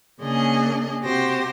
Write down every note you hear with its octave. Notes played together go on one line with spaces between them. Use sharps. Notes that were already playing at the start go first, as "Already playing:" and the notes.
C#3 A#3 D4 G#4 D#5 G#5
C3 C4 F#4 G4 C5 A#6